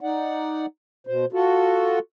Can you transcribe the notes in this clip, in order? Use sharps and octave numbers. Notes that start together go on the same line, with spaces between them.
D#4 D5 F#5
B2 C5
F4 F#4 A4